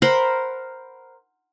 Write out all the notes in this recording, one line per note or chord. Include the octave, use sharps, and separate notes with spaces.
A#4 C5 F#5 B5